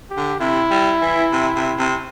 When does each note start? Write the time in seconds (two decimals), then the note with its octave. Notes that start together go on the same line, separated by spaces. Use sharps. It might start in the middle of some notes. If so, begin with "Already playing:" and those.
0.10 G4
0.17 D3
0.40 C3 E4
0.71 G3
1.02 E3
1.33 C3
1.56 C3
1.78 C3